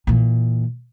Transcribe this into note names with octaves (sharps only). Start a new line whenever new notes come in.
A#2 E3